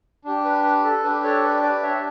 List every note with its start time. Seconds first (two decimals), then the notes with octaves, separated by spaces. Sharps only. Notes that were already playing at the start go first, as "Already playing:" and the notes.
0.24 D4 G4
0.44 B4
0.64 B4
0.84 A4
1.03 D4 G4 B4
1.23 A4 C#5
1.43 B4 D5
1.62 B4 D5
1.82 D4 G4 C#5 E5